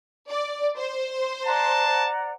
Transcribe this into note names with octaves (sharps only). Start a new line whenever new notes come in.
D5
C5
D5 F#5 A5 A#5